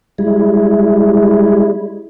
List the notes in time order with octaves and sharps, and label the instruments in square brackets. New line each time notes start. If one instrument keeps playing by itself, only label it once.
[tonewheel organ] G3 G#3 E4